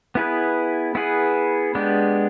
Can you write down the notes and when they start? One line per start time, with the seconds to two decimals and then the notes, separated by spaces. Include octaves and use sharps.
0.15 B3 E4 G#4 B4
0.95 B3 E4 G#4 B4
1.75 G#3 B3 D4 G4